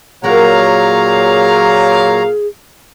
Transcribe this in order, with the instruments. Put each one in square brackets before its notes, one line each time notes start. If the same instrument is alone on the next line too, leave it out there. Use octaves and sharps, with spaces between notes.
[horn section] A#2 F5 [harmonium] F#3 C#5 A#5 [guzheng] F#4 A#4 [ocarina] G#4